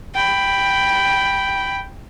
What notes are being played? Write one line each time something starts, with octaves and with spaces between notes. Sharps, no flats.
G5 B5